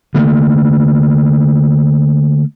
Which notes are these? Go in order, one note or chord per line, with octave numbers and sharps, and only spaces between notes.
D3 A3 A#3